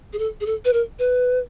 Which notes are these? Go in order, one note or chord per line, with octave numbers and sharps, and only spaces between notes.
G#4
A4
G#4
A4
B4
A#4
B4